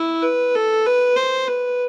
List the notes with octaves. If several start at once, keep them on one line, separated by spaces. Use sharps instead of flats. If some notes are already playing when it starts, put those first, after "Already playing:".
Already playing: E4
B4
A4
B4
C5
B4